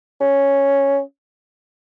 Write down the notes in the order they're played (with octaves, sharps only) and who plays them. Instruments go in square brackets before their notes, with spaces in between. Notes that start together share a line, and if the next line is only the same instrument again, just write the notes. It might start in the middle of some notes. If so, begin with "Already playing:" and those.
[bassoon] C#4